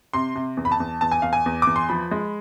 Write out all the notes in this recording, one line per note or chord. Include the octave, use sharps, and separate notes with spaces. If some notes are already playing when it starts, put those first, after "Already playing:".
C3 C6
C3
E2
B5
A5
E2
E2 A5
G#5
E2 F5
G#5
E2
E2 D6
C6
F3 B5
G#3